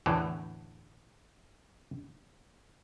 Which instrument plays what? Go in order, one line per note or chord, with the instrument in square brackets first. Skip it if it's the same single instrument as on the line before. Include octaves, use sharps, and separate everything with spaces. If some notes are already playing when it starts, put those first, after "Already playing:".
[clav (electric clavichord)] E2 A2 D3 E3